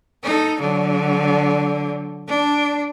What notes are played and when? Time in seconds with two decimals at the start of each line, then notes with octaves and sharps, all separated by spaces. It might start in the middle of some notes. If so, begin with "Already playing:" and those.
0.23 D#4 A4
0.60 D3 F#3
2.28 D4